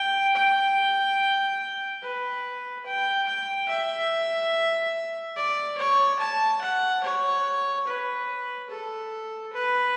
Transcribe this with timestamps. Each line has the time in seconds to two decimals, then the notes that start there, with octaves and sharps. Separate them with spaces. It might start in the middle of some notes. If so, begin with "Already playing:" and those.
Already playing: G5
0.35 G5
2.03 B4
2.86 G5
3.27 G5
3.68 E5
5.36 D5
5.78 C#5
6.19 A5
6.61 F#5
7.03 C#5
7.87 B4
8.70 A4
9.53 B4